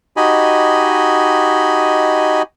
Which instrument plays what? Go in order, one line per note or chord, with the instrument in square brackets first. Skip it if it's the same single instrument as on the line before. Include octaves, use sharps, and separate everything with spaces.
[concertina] D#4 F#4 G4 D#5 G#5 B5